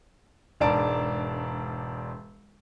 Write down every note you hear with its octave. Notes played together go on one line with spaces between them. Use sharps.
E1 G#2 D4 A#4 A5 D7